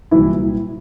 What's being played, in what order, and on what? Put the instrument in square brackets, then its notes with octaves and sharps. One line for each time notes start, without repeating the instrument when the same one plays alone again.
[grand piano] C2 A#2 E3 F#3 E4